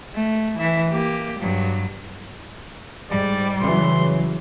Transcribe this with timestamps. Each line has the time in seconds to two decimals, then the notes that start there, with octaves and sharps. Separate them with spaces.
0.14 A3
0.58 E3 E5
0.91 A#3 G4
1.40 G2 F#3
3.11 G#2 G3 D5
3.61 C#3 E3 F#3 C6